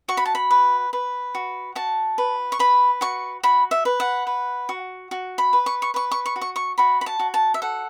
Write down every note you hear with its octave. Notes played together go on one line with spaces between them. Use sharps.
F#4 C#6
B5
A5
B5
B4
B4
F#4
F#4 A5
B4
C#6
B4 B5
F#4 C#6
F#4 B5
E5
B4
F#5
B4
F#4
F#4
B5
B4
C#6
C#6
B4 C#6
C#6
C#6
F#4
C#6
C#6
F#4 B5
B5
A5
F#4
A5
E5
A4 F#5